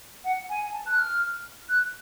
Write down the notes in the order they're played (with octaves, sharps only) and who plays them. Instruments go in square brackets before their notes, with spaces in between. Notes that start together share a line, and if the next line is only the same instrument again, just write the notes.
[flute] F#5
G#5
A5
F#6
F6
F#6